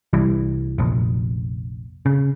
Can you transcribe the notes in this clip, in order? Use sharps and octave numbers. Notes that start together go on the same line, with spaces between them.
C2 E3 G3
F1 A#1
C#3